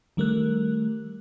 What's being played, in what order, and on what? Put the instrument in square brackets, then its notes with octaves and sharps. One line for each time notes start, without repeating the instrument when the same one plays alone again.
[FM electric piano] D#3 G3 A3 A#4 F#6